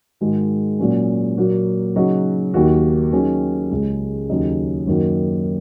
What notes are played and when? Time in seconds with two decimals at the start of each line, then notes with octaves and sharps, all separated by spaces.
0.21 G#2 D#3 G#3 F#4
0.79 A#2 F#3 C#4
1.37 A#2 F#3 A#3 F#4
1.96 C#3 F#3 D#4 F#4
2.54 D#2 D#3 A#3 F#4
3.12 D#3 F#3 C#4 G#4
3.71 C#2 C#3 G#3
4.29 D#2 C#3 F#3 D#4
4.87 F#2 D#3 A#3 F#4